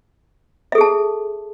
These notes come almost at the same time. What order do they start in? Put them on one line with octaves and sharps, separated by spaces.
E5 A4 G#4 A5